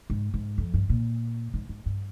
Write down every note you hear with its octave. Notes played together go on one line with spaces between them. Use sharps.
G#2
G#2
F2
G2
A#2
G#2
G#2
G2